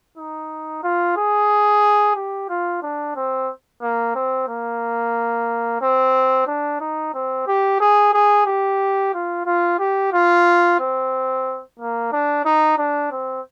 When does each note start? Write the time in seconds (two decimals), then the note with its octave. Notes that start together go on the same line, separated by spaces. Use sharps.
0.18 D#4
0.83 F4
1.17 G#4
2.16 G4
2.49 F4
2.83 D4
3.16 C4
3.82 A#3
4.15 C4
4.49 A#3
5.81 C4
6.48 D4
6.81 D#4
7.14 C4
7.47 G4
7.80 G#4
8.13 G#4
8.47 G4
9.14 F4
9.46 F4
9.80 G4
10.13 F4
10.80 C4
11.79 A#3
12.12 D4
12.45 D#4
12.78 D4
13.12 C4